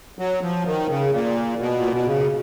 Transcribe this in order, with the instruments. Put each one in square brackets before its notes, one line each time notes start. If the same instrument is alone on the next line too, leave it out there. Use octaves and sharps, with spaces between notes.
[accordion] F#3
F3
D#3
C#3
A#2
B2
A#2
B2
C#3